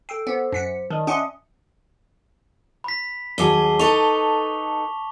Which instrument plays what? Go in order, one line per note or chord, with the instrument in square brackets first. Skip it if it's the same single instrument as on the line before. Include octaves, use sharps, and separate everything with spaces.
[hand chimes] A4 E6 C7 [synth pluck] G5
[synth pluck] B3 [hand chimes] C5 D6
[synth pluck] F#2 B6 C#7
[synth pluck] D#3 [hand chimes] D5 D#5 A5
[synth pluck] C#4 F#5 C6 [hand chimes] E5 D6 D#6
[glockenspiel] B5 B6
[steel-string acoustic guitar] D#2 F#3 G#4 [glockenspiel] A5 D6 G7
[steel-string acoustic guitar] D#4 A4 B4 [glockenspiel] C#6 F7